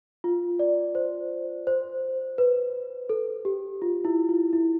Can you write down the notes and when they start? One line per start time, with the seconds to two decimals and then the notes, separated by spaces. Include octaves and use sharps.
0.24 F4
0.59 D5
0.95 C5
1.67 C5
2.38 B4
3.10 A4
3.45 G4
3.82 F4
4.05 E4
4.29 F4
4.53 E4